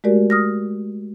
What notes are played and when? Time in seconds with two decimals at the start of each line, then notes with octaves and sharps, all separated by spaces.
0.04 G#3 A3 F#4 G4 A#4 D5
0.30 D#6 F6 A#6